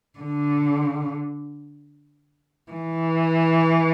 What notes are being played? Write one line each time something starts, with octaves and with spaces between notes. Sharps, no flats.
D3
E3